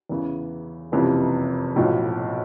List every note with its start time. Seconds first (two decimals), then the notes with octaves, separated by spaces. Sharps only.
0.09 E2 C#3 E3
0.92 F#1 F2 C3 E3
1.76 B1 A2 F3